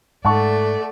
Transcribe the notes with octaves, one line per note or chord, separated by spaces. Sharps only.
G#2 A3 D5 F#5 A5 C#6